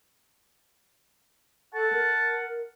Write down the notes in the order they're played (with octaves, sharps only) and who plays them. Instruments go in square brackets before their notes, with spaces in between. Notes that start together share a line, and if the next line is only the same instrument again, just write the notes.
[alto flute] A4 [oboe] F#5 [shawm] A5
[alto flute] A#4